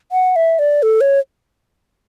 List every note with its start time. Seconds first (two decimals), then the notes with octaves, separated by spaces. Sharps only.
0.12 F#5
0.36 E5
0.59 D5
0.83 A4
1.01 C#5